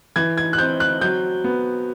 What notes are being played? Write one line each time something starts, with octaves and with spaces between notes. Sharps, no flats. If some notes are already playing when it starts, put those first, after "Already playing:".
E3 G#6
G#6
F#6
C4 G6
F#6
F#3 G6
B3